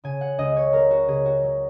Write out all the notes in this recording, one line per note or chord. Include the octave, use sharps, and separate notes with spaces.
C#3 G#5
F#5
C#2 D#5
C#5
F#3 A#4
F#4
C#3 G#4
F#4
F#3